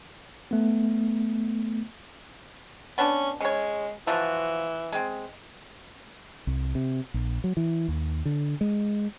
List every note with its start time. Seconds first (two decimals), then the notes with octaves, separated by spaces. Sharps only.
0.51 A3 B3
2.98 B3 C#4 D4
3.41 G#3 C#4 C#5
4.07 E3 F3 F4 F#4
4.92 G#3 C4
6.47 C2
6.75 C3
7.14 A#1
7.44 F#3
7.57 E3
7.88 D#2
8.26 D3
8.61 G#3